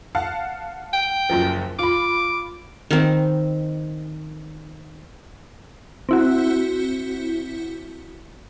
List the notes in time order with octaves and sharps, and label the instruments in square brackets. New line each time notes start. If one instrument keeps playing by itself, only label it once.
[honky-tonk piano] F5 F#5 A5
[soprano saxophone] G5
[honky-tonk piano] F#1 F#2 F3
[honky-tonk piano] F4 B5 [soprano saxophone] D6
[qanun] D#3 C4
[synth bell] C4 E4 F#4